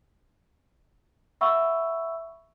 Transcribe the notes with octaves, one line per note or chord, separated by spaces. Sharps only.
E5 F#5 B5 C#6 E6